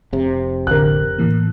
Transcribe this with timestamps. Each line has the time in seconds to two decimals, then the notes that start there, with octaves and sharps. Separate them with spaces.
0.13 F1 C3
0.67 A1 D3 A#4 F#6
1.18 A2 E3 A#3